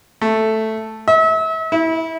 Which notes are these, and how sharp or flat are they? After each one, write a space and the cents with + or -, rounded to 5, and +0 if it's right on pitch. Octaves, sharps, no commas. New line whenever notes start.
A3 +0
E5 -35
E4 -25